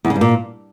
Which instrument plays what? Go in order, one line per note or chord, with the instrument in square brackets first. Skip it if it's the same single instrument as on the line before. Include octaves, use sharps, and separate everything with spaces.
[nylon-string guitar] E2
C#3
G2
A#2